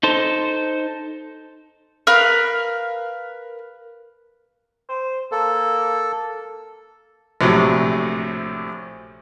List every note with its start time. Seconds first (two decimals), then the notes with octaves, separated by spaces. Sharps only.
0.03 D#4 A4 C5
2.07 A#4 B4 F5
4.89 C5
5.32 A#3 A4
7.41 A#1 A2 C3 F#3